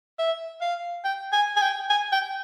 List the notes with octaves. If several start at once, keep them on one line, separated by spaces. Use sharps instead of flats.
E5
F5
G5
G#5
G#5
G5
G#5
G5